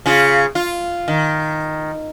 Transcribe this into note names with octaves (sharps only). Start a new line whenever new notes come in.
C#3 F4
F4
D#3